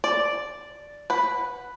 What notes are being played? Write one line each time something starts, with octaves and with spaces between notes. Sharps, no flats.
D5
B4 F#5